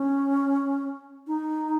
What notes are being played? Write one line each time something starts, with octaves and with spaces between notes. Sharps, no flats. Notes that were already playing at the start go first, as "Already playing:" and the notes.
Already playing: C#4
D#4